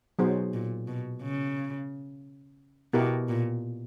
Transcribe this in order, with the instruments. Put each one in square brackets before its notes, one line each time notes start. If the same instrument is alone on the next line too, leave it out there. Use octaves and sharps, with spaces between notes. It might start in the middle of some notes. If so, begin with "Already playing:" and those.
[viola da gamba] B2 [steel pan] F#3 B3 D#4 G#4 C5
[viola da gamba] A#2
B2
C#3
[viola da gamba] B2 [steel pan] B3 E4 G4 A#4
[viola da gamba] A#2